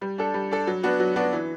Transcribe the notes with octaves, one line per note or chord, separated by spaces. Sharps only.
G3
D4 A4
G3
D4 A4
F#3
B3 D4 F#4
F#3
B3 D4 F#4
E3